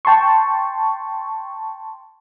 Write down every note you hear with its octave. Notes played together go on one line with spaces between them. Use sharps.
G5 A5 C6 C#6